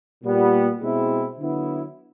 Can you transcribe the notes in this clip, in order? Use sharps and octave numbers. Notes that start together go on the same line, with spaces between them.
A#2 G3 B3
B2 G#3 C4 E4
D3 F#3 B3 E4